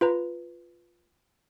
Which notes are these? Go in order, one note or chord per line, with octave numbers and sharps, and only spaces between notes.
F4 B4 A#5